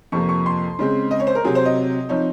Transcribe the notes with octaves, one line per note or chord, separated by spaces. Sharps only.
F2 C3 F3 A#3 C#6
C#6
C6
C#3 G#3 C4
D#5
C#5
C5
A#4
C3 F#3 C4 G#4
C5
D#5
F3 C4 D#4 C#5